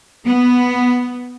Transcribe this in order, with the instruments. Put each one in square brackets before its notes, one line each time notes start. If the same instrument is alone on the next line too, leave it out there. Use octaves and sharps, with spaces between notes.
[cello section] B3